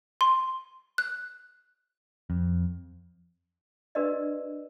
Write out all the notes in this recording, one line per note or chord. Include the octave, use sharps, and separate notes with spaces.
C6
F#6
F2
D4 F#4 A#4 B4 D5 D#5